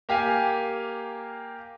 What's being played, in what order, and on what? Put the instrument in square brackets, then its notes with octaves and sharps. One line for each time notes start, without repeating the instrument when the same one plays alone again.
[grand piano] A#3 G4 F5 G#5